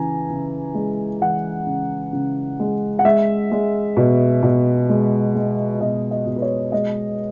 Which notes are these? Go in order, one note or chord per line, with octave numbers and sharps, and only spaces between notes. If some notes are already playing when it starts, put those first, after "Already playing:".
Already playing: C#3 E3 G#5 A#5
C#3
G#3
E3 F#5
C#3
C#3
G#3
F#5
G#3 E5
G#3
B2
B2
G#3
G#3
B2 D#5
D#5
B2
B4
C#5
G#3 D#5